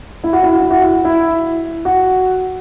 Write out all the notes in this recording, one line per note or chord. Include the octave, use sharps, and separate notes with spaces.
E4
F#4
E4
F#4
E4
F#4
E4
E4
F#4